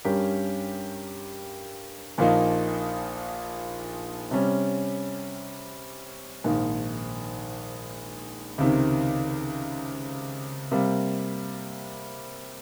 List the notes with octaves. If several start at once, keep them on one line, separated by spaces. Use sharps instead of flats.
G2 G3 C#4 G4 A#4
A#1 A#2 F3 A#3 D#4
C3 G3 C#4
A#1 G#2 D#3 A#3
C#2 C3 D#3
C3 G3 A#3